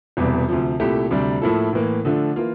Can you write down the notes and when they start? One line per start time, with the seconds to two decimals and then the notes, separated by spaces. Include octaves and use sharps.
0.17 E1 E2 C3 G3
0.48 D2 C3 F3
0.80 C2 A#2 A3 E4 G4
1.11 D2 C3 G3 D4
1.42 A2 F3 A#3 E4 A4
1.73 A2 E3 A#3
2.05 D3 F3 A3 D4
2.36 E3 A#3 F4